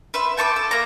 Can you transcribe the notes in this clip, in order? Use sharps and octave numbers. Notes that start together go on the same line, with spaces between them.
B4 E5 C6
G5 A5 C#6 D6
A4
A#3 A#5